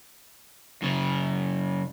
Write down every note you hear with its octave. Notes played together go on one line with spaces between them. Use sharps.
F#2 C#3